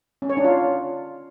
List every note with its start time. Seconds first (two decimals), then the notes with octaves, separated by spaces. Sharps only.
0.22 C#4
0.30 C#5
0.37 D4
0.45 F4